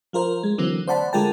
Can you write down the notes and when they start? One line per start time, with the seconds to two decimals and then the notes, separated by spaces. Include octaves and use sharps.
0.13 F3 F4 A#4 C5
0.43 G#3
0.58 D3 E3 F#3 A#3 C4
0.87 C5 D5 F#5 A5 B5
1.13 D3 G#3 F4 A#4 G5 A5